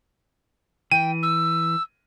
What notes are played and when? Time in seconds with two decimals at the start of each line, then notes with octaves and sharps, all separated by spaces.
0.92 E3 G5 D#7
1.23 E6